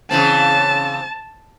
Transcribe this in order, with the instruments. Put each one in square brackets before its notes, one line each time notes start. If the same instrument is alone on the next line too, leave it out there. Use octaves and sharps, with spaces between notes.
[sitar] C#3 E3 C4 [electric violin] A5